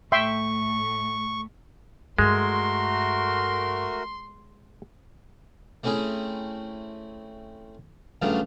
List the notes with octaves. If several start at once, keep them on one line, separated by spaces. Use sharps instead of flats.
A2 A3 E5 G5 C6 C#6
G2 G#3 A3 F#4 A#4 C6
A3 C4 C#4 E4 G#4
G2 C#3 F3 F#3 A3